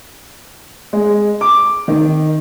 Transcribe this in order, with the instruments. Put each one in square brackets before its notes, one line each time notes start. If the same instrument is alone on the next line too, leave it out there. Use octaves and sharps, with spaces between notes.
[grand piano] G#3
D6
D#3